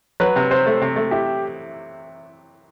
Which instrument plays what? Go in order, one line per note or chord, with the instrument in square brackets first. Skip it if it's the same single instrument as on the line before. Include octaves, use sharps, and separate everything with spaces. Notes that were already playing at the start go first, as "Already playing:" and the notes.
[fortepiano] F#3 [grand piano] B4
[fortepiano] C3
[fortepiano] C3 [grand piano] C5
[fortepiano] A3
C3
A3
[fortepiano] E4 [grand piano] G4